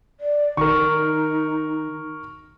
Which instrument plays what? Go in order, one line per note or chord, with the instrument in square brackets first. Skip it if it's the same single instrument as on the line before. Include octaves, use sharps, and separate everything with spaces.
[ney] D5
[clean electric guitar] D#3 [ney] D#4 [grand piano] A#4 C#6